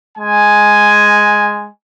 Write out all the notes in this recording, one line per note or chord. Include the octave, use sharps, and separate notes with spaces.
G#3 G#5